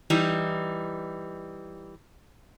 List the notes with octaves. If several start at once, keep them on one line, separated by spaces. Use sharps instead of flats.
E3 G3 D#4